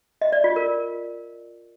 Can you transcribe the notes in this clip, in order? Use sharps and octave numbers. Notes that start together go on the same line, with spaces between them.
D#5
D5
F4
A#4